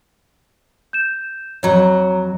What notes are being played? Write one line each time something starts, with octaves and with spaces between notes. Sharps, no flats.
G6 E7
F2 F#3 C#5 A#5